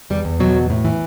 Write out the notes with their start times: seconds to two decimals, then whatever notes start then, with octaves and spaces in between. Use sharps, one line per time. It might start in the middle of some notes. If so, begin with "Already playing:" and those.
0.10 E2 G3
0.25 E2
0.40 B2 F#3
0.55 E2
0.70 A2
0.85 E3